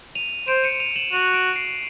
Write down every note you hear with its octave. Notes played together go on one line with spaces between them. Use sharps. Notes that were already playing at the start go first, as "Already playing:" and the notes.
D#7 F7
C5 D7 E7
C#7 D#7
D#7 F7
E7 F#7
F#4 D#7 F7
D7 E7
C7 D7